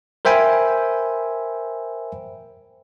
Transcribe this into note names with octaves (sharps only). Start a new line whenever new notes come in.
A#4 C5 E5 G5 G#5 B5